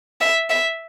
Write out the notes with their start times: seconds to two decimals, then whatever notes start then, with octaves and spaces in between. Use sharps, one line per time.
0.21 E5
0.50 E5